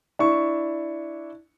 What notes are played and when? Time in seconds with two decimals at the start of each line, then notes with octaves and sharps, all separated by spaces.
0.19 D4 E4 C#6